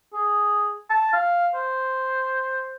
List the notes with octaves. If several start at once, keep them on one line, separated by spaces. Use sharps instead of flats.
G#4
A5
F5
C5